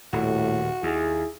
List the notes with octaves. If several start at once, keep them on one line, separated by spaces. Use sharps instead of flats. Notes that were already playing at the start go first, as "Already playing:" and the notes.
D#1 A2 F#4
D#2 E4 G#4